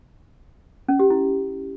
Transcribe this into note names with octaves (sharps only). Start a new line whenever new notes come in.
C#4
G4
E4